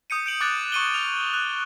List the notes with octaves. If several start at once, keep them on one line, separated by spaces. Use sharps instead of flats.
D#6 G6 C#7 D#7
G6 D7 F#7
D6 F#6 A6 D7
C#6 C#7 D#7 F#7 G7
F6 F7
F#6 F7